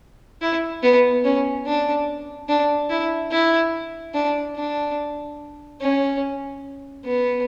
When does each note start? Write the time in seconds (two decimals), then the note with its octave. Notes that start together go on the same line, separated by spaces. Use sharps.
0.42 E4
0.83 B3
1.25 C#4
1.66 D4
2.49 D4
2.90 E4
3.31 E4
4.14 D4
4.56 D4
5.81 C#4
7.05 B3